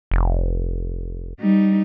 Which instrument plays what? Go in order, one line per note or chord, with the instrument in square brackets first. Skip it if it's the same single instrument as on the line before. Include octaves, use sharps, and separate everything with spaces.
[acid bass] F1
[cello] G3 D#4